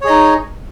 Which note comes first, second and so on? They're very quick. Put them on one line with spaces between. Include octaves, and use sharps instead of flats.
C#5 G#4 D#5 D#4